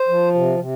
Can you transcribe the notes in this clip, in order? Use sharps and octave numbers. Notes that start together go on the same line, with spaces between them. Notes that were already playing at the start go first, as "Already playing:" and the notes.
Already playing: C5
F3
C3
C3